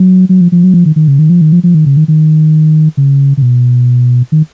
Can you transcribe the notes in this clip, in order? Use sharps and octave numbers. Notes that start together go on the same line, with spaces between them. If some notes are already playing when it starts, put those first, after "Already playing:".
Already playing: F#3
F#3
F3
F3
F#3
F3
D#3
D#3
C#3
D#3
F3
D#3
F3
F3
D#3
C#3
D#3
D#3
C#3
C#3
B2
D#3